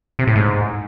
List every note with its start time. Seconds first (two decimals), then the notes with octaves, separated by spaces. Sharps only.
0.19 C3
0.27 A2
0.36 G#2